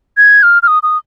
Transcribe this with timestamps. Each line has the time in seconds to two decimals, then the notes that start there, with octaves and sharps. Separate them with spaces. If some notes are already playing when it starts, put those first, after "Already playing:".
0.17 G#6
0.43 F6
0.63 F6
0.68 D#6
0.83 D#6